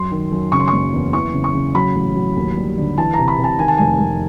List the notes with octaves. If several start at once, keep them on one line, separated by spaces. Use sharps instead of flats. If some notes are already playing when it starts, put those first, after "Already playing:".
Already playing: F#2 C6
D#3
F#2
C#3 C#6
C6
F#1 C#6
E2
E3 C#6
C#3
C#6
C#3
F#3 B5
A1
F#3
D#2
G3
D3
E3 A5
C3 A#5
B5
C3
A5
D#3 G#5
A5
F1 G#5
F1